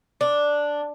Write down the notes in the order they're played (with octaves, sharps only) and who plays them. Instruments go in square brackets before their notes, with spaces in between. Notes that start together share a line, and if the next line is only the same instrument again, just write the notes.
[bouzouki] D4